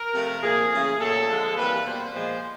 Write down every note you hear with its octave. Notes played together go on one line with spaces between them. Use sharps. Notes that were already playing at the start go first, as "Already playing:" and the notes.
Already playing: A#4
C3 F3 A3
A#2 F3 A#3 G#4
C#3 E3 A3
A#2 F#3 A3 A4
D3 F3 G#3
C3 E3 G3 A#3 B4
B2 G3 A#3 C5
A#2 F3 G#3